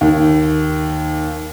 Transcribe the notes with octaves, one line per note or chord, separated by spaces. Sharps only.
D#2